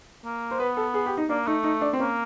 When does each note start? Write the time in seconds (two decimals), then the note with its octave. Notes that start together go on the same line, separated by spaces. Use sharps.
0.25 A#3
0.51 C5
0.59 B3 B4
0.77 A4
0.94 G#4
1.06 G4
1.17 D#4
1.29 A#3 D4
1.47 A3 D#4
1.64 D#4
1.81 D4
1.93 C4
1.99 A#3 C#4